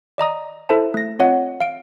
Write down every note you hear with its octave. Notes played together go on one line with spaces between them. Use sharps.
D5 D#5 A#5 D#6
E4 A4 C5 E5 A5
A3 A#6
C4 F4 C#5 D#5 F#5
F5 D7